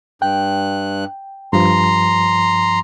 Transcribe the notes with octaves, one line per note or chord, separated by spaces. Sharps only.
G2 G5 F#6
G2 F3 A#5 C6